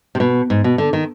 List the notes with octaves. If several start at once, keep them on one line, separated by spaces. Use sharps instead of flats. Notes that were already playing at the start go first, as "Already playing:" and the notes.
C3
B2
G#2
B2
D3
D#3